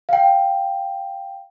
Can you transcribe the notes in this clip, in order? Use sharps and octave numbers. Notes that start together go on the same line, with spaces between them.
F5 G5